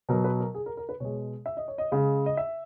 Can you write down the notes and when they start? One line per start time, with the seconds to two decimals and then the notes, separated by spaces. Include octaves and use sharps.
0.09 B2 F#3 A#4
0.24 B4
0.40 A#4
0.55 G#4
0.66 A#4
0.77 A#4
0.89 B4
1.00 B2 G#3 C#5
1.46 E5
1.57 D#5
1.68 C#5
1.78 D#5
1.92 C#3 G#3
2.26 D#5
2.37 E5